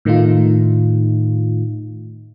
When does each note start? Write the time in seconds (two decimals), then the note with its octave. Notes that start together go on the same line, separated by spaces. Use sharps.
0.05 A2 D#3 A3 D#4 F4